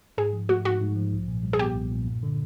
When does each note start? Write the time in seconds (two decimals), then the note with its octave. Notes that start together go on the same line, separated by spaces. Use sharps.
0.18 G#2 G#4
0.33 F3
0.49 A3 F#4
0.65 G#2 F#4
0.81 G#2
0.96 F3
1.12 B1
1.28 A#2
1.43 G3
1.53 G#4
1.59 B3 G4
1.75 B1
1.91 A#2
2.07 G2
2.23 D3